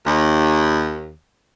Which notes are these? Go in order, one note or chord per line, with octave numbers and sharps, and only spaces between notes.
D#2